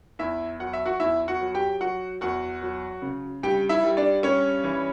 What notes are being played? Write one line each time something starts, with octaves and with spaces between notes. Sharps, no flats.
E2 E4 E5
F#3 F#5
E5
F#4 F#5
E2 E4 E5
F#4 F#5
F#3
G4 G5
F#3 F#4 F#5
E2 F#4 F#5
F#3
C#3
G2 G4 G5
E4 E5
G3
D4 D5
G2 C#4 C#5
E3